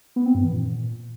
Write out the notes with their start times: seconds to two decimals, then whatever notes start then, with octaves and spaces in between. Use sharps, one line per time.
0.16 B3
0.25 C4
0.35 G2
0.44 E3
0.53 A#2